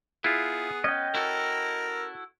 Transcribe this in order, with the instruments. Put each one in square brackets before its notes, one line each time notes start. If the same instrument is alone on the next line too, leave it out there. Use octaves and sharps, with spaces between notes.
[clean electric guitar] B3 [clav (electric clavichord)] E4 F4 [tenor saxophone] G#4
[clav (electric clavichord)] C#4 [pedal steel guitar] D#5 G5
[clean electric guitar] E4 F#4 A4 [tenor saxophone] A#4